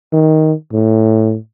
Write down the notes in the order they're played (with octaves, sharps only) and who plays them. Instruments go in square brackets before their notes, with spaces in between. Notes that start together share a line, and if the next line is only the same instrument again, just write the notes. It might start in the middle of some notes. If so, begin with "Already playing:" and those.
[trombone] D#3
A2